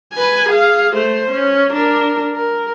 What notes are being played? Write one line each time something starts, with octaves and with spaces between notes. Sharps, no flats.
B4 G#5
G#4 F5
A3 C5
C#4
D4 A#4
A#4